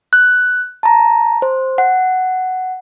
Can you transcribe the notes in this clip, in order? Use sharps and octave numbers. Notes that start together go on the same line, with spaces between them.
F#6
A5 A#5
C5
F#5